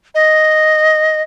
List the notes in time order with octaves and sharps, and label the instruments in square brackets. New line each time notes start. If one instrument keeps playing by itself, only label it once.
[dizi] D#5